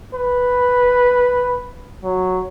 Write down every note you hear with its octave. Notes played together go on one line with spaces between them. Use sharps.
B4
F#3